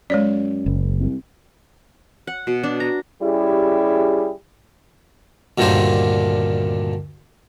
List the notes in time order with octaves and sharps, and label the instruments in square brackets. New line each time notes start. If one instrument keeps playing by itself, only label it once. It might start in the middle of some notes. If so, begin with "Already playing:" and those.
[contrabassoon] F#2 [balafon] G#3 C#5 D5
[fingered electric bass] F#1
[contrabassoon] C2
[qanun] F#5
B2
D4
A#5
[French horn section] G3 C#4 E4 G4 G#4
[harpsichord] D2 G2 A#2 D3 D#3 C5